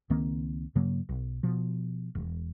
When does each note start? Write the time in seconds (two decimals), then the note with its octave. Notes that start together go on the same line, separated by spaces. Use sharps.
0.10 C#2 D#3 A#3 C4
0.75 G2 C#3 F#3 A#3
1.09 B1
1.43 B2 F3
2.15 E1